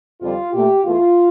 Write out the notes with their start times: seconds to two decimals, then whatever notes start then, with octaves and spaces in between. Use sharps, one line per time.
0.20 F2 D3 G3 F4
0.52 A#2 A3 G4
0.84 E2 E3 A3 F4